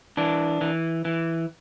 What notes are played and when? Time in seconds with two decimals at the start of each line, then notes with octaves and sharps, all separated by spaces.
0.17 E3 D4
0.61 E3
1.05 E3